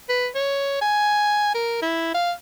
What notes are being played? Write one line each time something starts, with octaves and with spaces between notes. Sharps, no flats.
B4
C#5
G#5
A#4
E4
F5